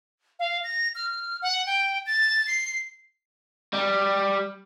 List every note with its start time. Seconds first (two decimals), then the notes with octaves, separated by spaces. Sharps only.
0.39 F5
0.64 A#6
0.95 F6
1.42 F#5
1.66 G5
2.06 A6
2.47 C7
3.73 G3